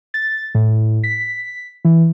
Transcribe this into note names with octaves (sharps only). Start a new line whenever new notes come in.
A6
A2
B6
E3